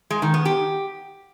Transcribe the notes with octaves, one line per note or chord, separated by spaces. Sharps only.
G#3
D#3
B3
G4